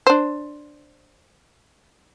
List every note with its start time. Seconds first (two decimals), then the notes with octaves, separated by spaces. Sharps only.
0.07 D4 C5